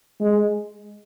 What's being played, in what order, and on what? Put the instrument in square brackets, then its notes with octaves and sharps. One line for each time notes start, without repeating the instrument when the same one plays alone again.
[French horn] G#3